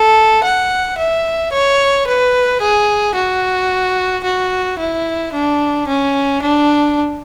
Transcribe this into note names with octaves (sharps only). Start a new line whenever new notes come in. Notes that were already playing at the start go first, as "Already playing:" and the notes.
Already playing: A4
F#5
E5
C#5
B4
G#4
F#4
F#4
E4
D4
C#4
D4